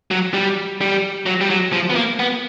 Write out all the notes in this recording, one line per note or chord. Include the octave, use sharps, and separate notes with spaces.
F#3
G3
G3
F#3
G3
F#3
F3
B3
A#3
B3